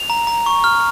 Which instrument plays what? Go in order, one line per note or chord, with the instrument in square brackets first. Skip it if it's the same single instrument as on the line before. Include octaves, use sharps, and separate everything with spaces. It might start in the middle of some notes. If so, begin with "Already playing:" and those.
Already playing: [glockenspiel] F7
A#5
A#5
C#6
F6